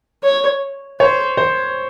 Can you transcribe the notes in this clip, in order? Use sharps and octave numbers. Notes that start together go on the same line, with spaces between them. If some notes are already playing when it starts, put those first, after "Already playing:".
C#5
C5 C#5
C5